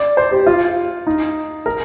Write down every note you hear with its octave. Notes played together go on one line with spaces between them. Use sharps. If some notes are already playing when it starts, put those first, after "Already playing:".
Already playing: D5
C5
G4
F4
D#4
A#4